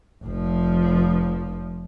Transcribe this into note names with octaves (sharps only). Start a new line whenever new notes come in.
F1 F3